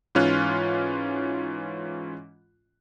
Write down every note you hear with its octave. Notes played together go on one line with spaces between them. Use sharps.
G#2 E3 C#4 F4 F6 F#6